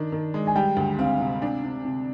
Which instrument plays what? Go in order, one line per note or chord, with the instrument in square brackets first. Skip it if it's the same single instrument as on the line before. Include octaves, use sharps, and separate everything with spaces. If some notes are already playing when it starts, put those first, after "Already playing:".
Already playing: [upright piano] D#3 D4
D#3
G#3
[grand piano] G#5
[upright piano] G3 [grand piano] G5
[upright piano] D2
[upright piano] C4 [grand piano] F5
[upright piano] C3
D4
C3
C3